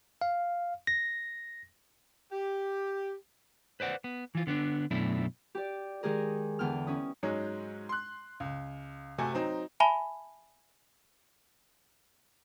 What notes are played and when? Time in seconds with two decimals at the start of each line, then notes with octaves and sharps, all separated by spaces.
0.21 F5
0.87 A#6
2.32 G4
3.80 B4 C5 D5 F#5
4.04 B3
4.35 E3 F4
4.47 D3 B3 C#4 D4
4.91 F#2 B2 A3 D4 E4
5.55 G4 D5
6.03 D#3 G#3 G4 G#4 A#4
6.59 E2 D3 B3 G5 F6
6.87 C#4 E4 D#6
7.23 G#2 F#3 G#3 C#4
7.89 C6 F#6
8.40 C#2
9.18 C3 A3 F#4 G#5
9.34 F#3 C4 D#4
9.80 E5 G#5 A5 B5 G7